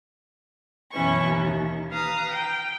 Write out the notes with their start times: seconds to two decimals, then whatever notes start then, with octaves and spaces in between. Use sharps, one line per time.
0.91 F#2 B2 E3 C#4 E4 C#6
1.24 D#2
1.88 B4 F5 A#5 D#6
2.30 G5